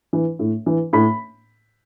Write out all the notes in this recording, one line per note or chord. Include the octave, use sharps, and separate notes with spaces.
E3
A2
E3
A2 B5